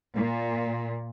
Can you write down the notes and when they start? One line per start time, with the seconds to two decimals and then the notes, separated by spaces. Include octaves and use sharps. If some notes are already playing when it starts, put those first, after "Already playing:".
0.15 A#2